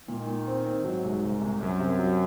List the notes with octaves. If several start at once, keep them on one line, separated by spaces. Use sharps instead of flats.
A#2 D#3
A#2
C4
C4
G#2 F#3
C2
C2
C2
C2 F#2
C3
F#3